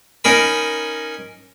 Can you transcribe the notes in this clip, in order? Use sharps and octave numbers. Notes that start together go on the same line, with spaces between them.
C#4 D#4 A#4 B5